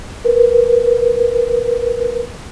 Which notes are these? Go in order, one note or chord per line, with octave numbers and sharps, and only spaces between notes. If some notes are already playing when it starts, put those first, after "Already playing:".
A#4 B4